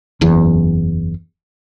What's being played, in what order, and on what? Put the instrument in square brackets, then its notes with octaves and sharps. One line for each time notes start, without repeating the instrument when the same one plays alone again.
[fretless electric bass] F#1 E2